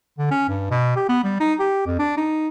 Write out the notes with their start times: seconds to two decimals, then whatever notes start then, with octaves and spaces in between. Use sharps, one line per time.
0.18 D3
0.31 C#4
0.49 G2
0.71 B2
0.96 G4
1.09 B3
1.24 G3
1.40 D#4
1.59 G4
1.86 F2
1.99 D4
2.17 D#4